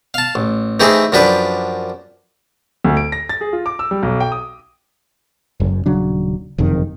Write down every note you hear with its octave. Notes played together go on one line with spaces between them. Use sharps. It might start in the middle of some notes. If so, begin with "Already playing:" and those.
F5 A5
A1
E3 A3 C4 D#4 G4 G#4
F#2 F3 D4 G4 B4
D2
D7
A#6
A6
G#4
F4
D6
E6
G3
B1
G5
D#6
F#1 F#2
D#1 C#3 F#3 D4
F#1 F2 C3 D#3